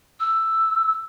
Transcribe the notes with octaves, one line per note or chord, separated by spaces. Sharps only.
E6